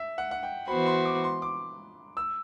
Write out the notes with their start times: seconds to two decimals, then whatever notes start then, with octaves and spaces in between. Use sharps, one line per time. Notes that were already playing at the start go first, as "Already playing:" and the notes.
Already playing: E5
0.18 F#5
0.31 F#5
0.43 G5
0.68 E3 B3 F#4 C5 B5
0.86 C6
1.05 D6
1.24 C6
1.42 D6
2.17 E6